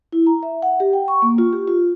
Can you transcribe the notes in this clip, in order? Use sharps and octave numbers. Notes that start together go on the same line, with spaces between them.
E4
A#5
E5
F#5
G4
G5
C#6
A#3
F4
G4
F4